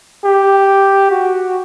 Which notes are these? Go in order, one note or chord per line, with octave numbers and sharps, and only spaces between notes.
G4
F#4